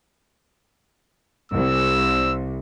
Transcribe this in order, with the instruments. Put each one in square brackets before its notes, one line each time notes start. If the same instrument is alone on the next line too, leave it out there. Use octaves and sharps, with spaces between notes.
[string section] C2 [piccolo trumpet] E6